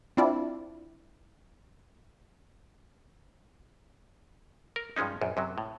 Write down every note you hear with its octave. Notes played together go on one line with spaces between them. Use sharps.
C4 D4 E4 F4 D5
A#4
G2 F3 G#3 C#4 D#4
A#1 F#2
F#2 C3 F#3
A2